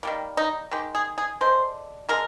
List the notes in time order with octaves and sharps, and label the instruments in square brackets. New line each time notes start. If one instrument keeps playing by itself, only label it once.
[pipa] D#3 G3 A#3
D#4
D#3 G#3 G4
G#4
G#4
D3 G#3 C5
D3 G#3 A#4